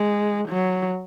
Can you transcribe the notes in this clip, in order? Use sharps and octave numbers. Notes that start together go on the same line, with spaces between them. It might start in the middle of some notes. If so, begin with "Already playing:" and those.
Already playing: G#3
F#3